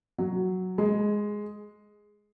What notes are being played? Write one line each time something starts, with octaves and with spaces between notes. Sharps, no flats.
F#3
G#3